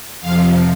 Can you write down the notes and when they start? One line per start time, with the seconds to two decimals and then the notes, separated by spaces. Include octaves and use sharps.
0.20 F2 C3 F3 F5